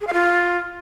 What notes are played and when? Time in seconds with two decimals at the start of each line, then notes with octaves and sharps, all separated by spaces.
0.01 G#4
0.07 F5
0.13 F4